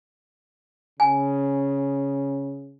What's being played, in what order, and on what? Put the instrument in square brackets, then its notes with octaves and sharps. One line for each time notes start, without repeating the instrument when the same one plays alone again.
[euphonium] C#3 [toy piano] G#5